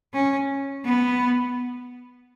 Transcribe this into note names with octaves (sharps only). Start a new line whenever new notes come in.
C#4
B3